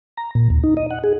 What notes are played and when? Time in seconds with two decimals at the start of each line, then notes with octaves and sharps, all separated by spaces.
0.17 A#5
0.35 A#2
0.50 D#2
0.64 D#4
0.77 D#5
0.91 F#5
1.04 G#4